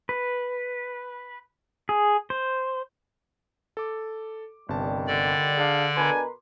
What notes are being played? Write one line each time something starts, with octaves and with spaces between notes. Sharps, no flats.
B4
G#4
C5
A4 D6
G1 C3 D#3 G3 A5
D3 D5
D4 G#4 F5
B2 D4 A#4 B4 G#5 C6